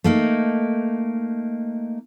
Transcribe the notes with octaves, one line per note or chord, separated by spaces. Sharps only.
A3 A#3 D#4